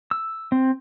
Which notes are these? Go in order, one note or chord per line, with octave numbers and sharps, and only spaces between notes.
E6
C4